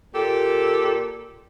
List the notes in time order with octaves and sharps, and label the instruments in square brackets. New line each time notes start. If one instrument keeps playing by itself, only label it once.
[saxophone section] A#2 G4 A4